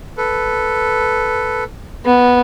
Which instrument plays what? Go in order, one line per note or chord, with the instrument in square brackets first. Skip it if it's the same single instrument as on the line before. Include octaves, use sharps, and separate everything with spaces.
[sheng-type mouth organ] A4 B4
[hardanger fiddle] B3